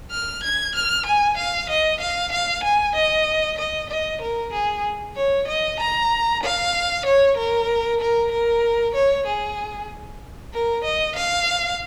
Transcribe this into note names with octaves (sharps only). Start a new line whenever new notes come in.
F6
G#6
F6
G#5
F5
D#5
F5
F5
G#5
D#5
D#5
D#5
A#4
G#4
C#5
D#5
A#5
F5
C#5
A#4
A#4
A#4
C#5
G#4
A#4
D#5
F5